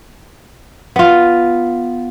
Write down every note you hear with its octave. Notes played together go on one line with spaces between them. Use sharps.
B3 F4